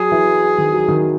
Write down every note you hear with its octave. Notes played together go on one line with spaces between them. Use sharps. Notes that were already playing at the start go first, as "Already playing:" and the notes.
Already playing: F#3 G#4
E3
D#3
F#3
D#3